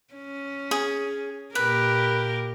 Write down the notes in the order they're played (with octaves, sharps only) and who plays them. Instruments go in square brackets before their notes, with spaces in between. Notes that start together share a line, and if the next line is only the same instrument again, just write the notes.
[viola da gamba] C#4
[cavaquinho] G#4
[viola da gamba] A#2 G4 A#4 [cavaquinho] B4